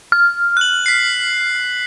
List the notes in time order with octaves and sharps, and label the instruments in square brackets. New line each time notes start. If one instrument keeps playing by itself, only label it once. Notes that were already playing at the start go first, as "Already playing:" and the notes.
[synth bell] F6
[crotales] F#6 F#7
B6 C7